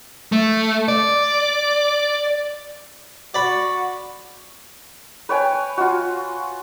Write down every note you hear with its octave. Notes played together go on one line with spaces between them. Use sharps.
A3
D5
F#4 D5 B5
B4 C#5 G5 G#5
F4 F#4